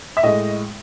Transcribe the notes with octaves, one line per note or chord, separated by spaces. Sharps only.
E5
A2 G#3 D#5